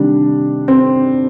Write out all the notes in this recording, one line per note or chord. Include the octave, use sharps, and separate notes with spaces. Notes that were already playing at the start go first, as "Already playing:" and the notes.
Already playing: C3 D#3 G3 D4
C4